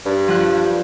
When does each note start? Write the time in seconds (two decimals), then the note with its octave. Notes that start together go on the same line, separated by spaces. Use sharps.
0.06 G2
0.28 F3 F#6